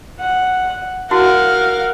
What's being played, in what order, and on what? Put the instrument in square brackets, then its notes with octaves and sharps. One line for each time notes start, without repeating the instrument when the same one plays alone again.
[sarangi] F#5
[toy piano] E4 F#4 [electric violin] A#4 F5 [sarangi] F#5